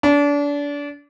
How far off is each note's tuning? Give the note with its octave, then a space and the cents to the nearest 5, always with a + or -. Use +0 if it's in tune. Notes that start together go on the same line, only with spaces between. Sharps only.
D4 -30